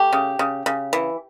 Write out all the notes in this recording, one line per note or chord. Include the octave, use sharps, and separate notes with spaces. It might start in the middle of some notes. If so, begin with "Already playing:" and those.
Already playing: A3 G4
C#3
C#3
C#3
E3